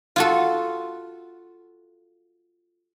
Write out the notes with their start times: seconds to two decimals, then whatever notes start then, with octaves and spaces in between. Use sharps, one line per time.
0.16 F4 F#4 A4